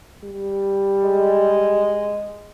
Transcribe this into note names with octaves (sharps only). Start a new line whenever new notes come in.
G3
G#3